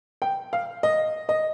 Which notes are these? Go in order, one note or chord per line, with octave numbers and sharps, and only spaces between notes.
G5
F5
D#5
D#5